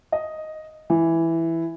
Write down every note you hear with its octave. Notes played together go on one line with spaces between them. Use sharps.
D#5
E3